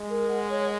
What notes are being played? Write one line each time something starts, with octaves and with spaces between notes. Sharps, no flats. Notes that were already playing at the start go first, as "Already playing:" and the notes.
Already playing: G#3
A#4
F#5
C#5